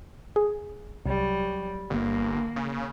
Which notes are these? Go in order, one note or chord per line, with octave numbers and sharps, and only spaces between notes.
G#4
C2 F#3 G3
G1 A#3
C#3